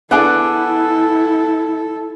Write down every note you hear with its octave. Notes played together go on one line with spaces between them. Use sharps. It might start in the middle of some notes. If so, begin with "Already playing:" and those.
B3 D4 E4 G#4 A4 F#5 D6